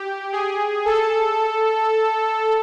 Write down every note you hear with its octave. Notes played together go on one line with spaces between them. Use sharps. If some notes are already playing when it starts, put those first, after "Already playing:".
Already playing: G4
G#4
A4